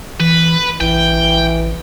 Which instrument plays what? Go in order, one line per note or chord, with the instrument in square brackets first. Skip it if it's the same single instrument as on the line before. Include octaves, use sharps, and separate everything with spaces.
[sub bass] E3 [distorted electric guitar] B4
[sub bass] A1 [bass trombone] E3 [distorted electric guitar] G5